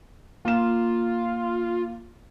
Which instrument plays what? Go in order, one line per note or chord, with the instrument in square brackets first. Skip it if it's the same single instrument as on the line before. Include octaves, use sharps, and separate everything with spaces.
[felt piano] A#3 E7 [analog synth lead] F4